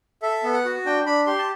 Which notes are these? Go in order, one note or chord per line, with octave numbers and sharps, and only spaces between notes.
A4 E5
B3
F#5
F#4
D4 G5
D4 B5
G4 C6
A5